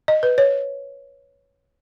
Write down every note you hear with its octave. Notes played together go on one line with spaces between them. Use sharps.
D#5
B4
C#5